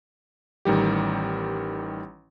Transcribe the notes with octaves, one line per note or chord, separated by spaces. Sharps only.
A1 D#3 G3 G4